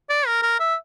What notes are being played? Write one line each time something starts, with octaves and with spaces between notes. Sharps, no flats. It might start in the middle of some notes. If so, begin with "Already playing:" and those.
D5
A#4
A#4
E5